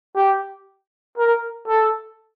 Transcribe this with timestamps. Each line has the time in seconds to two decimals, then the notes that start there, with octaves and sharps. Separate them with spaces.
0.16 G4
1.18 A#4
1.68 A4